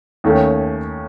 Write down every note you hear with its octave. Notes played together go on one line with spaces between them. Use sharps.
D#2 D#3 A3 C#4